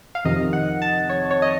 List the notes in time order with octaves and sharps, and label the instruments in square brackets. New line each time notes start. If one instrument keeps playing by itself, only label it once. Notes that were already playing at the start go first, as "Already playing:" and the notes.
[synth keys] F5
F2 C3 D#3 D#5
F#5
A5
C#5
C#5
D#5